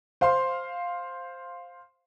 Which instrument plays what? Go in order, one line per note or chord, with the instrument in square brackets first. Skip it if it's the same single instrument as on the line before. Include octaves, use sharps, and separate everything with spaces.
[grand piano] C5 F5 C6